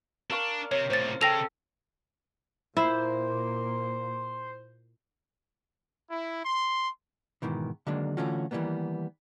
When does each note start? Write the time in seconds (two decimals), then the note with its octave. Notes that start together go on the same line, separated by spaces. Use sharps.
0.30 D4 A#4 F5 C#6
0.71 C3 C#5
0.90 A2 C3 C5 A6
1.21 C#3 A4 G5 A#6 F7
2.77 A#2 A#3 E4 C5
6.10 E4
6.45 C6
7.42 G#2 B2 D#3 E3
7.87 D3 D#3 F#3 G#3 A#3 D4
8.17 D3 E3 A3 C#4 F4 F#4
8.51 D#3 E3 F#3 G3 A#3 B3